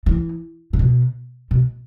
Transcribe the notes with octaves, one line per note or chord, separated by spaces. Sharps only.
E3
A#2
B2
B2